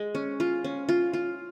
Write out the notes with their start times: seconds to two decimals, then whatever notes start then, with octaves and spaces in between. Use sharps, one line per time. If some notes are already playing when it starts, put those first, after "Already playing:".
Already playing: G#3
0.15 C#4
0.40 F4
0.64 C#4
0.89 F4
1.13 F4